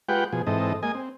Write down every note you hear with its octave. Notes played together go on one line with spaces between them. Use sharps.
G#3 F4 G4 B4 F#5 G5
B2 F3 G#4
G#2 E3 C4 A4 D#5
G#3 A#3 D#5 G#5
C4